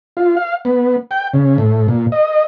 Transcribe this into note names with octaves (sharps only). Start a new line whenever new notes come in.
F4
F5
B3
G5
C#3
A2
A#2
D#5